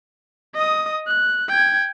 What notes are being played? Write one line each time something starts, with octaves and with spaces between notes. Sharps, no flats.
D#5 D#6
F#6
G5 G#6